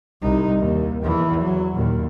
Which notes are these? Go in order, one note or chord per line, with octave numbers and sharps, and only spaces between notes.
C2 D#4
D#2
E2 E3
F#3
D#2 A#2